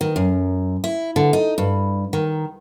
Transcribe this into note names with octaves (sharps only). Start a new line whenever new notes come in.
D#3
F#2
E4
D3
D#4
G2
D#3